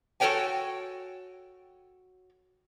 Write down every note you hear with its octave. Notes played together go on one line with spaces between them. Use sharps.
F#4 A4 A#4 C#5 G5 G#5